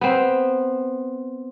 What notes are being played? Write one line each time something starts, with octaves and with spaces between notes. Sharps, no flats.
B3 C4